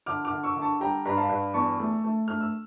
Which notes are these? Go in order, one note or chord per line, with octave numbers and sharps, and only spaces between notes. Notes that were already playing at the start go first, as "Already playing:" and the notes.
D3 D6 F6
D6 F6
D3
C#6 E6
D3
A5 C#6
G3 G5 A#5
G2 A#5
F5 A5
G2
E2 A5 C#6
A3
A3
A3 F6
E6